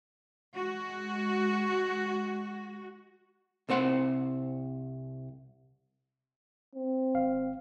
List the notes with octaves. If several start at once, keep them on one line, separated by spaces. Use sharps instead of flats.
G#3 F#4
C2 C4 C5 F#5
C4
G#1 F5